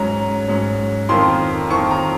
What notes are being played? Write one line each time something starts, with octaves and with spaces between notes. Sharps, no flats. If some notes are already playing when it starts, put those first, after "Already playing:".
Already playing: G#2 F#3 C#4 A#5
G#2 F#3 C#4
F2 D#3 A#3 C6
F2 D#3 A#3 C#6
A#5